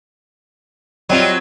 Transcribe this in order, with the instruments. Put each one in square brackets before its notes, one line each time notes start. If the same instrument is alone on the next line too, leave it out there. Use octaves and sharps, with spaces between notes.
[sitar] F#3 C4 F4 [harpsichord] G3 C#5 D#5